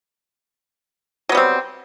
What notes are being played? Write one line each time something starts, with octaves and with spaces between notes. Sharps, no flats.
F#3 G3 B3 C4